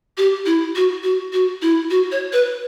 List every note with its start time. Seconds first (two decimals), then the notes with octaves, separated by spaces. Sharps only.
0.18 G4
0.46 E4
0.76 F#4
1.03 F#4
1.33 F#4
1.62 E4
1.90 F#4
2.11 C#5
2.33 B4